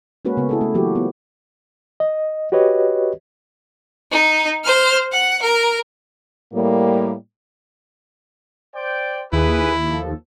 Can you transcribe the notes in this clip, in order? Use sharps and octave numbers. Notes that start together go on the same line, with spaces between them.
G#3 A#3 C#4 F#4 B4
C#3 B3
E4 G#4 A4
A3
E3 F#3 A#3 F#4 G4
B3 F4
D#5
F#4 G4 B4 C#5 D#5
D#4
C5 F6
F#5
A#4
A2 G3 A#3
C5 D5 G5
D#2 E4 G#4 B4
F3 A4